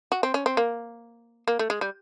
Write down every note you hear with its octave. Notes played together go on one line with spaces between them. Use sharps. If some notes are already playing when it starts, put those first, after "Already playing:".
F#4
C4
C#4
C4
A#3
A#3
A3
G#3
G3